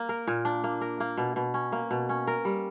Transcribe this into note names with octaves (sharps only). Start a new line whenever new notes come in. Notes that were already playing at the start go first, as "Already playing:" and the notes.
Already playing: A#3
A#4
A#2
D4
A#3
A#4
A#3
B2
B2
C#4
A#3
B2
C#4
A#4
G3